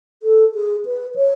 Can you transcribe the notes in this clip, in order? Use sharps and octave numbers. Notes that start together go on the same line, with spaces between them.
A4
G#4
B4
C#5